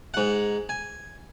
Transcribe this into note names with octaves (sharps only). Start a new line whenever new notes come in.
G#2 F#5
G#5